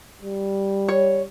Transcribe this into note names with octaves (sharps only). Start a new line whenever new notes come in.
G3
C#5